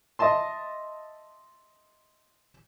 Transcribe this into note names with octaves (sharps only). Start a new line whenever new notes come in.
D#5 E5 A5 C6